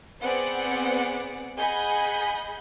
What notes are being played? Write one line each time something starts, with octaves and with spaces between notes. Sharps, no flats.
B3 C4 G#4 D5 F#5
G#4 D#5 F#5 G#5 B5 G6